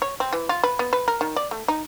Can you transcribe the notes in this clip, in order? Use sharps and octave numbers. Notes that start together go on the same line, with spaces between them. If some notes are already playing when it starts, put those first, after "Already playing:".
C#5
C4
E3
F4
B4
B3
B4
A#4
D#3
D5
A3
D#4